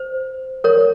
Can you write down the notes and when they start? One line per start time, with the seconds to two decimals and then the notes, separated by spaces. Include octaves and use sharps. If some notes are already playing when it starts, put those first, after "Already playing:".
Already playing: C5
0.64 A#4 C#5